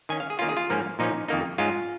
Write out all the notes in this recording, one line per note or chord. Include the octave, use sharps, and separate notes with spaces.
D#3 C#4 G#5
F5
G#4
D#3 A#3 C#4 F4
G#4
F4
G#2 F3 A#3 C#4
A#2 F3 C#4 D#4
F2 D#3 A#3 D#4
G#2 G#3 C#4 F4